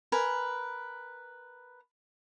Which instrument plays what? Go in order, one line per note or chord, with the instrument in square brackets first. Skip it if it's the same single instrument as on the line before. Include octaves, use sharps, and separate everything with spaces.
[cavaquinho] A#4 B4 G#5